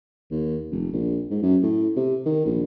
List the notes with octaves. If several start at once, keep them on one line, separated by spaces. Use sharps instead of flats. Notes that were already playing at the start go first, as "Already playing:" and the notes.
D#2
F1
A#1
G#2
F#2
A2
C3
D#3
A#1